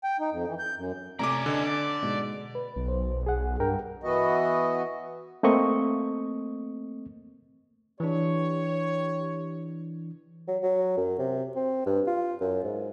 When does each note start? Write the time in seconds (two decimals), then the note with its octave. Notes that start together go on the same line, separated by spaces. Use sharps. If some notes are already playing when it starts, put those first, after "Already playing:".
0.04 G5
0.20 D#4
0.32 F2
0.48 E3
0.59 G6
0.77 F#2
1.19 C3 A3 C#4 D5 A#5 D6
1.46 D3 D#5 D6
1.64 D5
2.02 G#2 B2 G#3
2.55 B4
2.76 B1
2.88 C5
3.26 G#4 F#5
3.60 G2 A#4 G5
4.03 E3 B3 F#4 D#5
5.43 A3 A#3 C4 D#5 C#6
8.00 E3 D4 G4 C#5
10.48 F#3
10.63 F#3
10.97 F#2
11.19 C3
11.56 C4
11.86 G2
12.07 F4
12.41 F#2
12.63 G#2